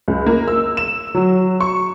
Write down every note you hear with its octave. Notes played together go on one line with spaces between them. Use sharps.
C#2
A#3
E6
E7
F#3
C#6